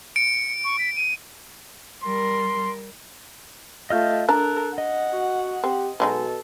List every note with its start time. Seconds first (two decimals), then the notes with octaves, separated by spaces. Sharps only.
0.16 C#7 D7
0.64 C#6
0.79 B6
0.96 D#7
2.03 G3 A#4 C6
3.90 A3 F4 D#5 F6 G6
4.29 D4 A4 A#4 A5 A#5 F#6
4.78 D#5 F#5
5.13 F#4
5.64 C4 G4
6.00 B2 F#3 G#3 D#4 A4